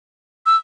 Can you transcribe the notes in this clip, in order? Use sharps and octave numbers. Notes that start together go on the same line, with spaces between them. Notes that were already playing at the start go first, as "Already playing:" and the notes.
E6